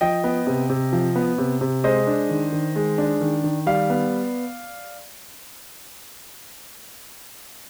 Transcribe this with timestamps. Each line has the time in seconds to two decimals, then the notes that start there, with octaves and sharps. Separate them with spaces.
0.01 F3 D#5 G5
0.24 B3
0.47 C3
0.70 C3
0.93 F3
1.16 B3
1.38 C3
1.61 C3
1.84 G#3 C5 D#5
2.07 D4
2.29 D#3
2.52 D#3
2.76 G#3
2.98 D4
3.21 D#3
3.44 D#3
3.66 G3 D5 F5
3.90 B3